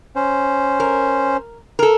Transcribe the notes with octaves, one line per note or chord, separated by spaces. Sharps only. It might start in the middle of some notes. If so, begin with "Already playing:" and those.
C#4 C5
A#4
A4 A#4